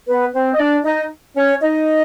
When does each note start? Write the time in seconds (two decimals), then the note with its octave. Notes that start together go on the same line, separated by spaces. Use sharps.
0.09 B3 B4
0.34 C4 C5
0.54 D#5
0.60 D4 D5
0.85 D#4 D#5
1.36 C#4 C#5
1.62 D#4 D#5